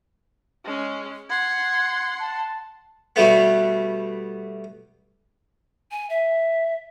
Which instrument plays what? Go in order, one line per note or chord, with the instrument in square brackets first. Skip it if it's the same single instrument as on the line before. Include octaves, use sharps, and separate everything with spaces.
[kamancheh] G#3 C#4
[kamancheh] F#5 C6 [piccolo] G#6
[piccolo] A5
[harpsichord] B2 G3 A3 B3
[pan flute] G#5
E5